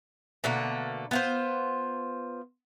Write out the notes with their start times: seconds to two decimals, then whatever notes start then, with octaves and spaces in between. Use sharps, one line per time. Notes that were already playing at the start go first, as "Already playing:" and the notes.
0.44 B2 D3 A3 A#3
1.11 B3 F4 C5